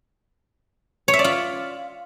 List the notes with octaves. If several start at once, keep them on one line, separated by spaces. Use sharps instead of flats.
C#5
E5
D5
F4